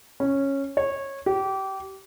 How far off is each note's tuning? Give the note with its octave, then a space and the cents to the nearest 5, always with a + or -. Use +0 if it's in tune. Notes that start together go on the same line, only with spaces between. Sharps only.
C#4 -10
C#5 -20
G4 -25